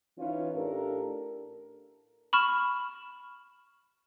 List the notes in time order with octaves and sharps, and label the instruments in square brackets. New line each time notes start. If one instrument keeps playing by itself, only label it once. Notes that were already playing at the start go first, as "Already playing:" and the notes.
[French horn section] E3 C#4 D#4 F4 B4 C#5
A2 D4 G4 A4 A#4
[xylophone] B5 C#6 F6 E7